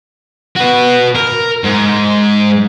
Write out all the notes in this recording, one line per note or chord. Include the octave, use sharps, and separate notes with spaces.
F#4 B4
A#4
G#2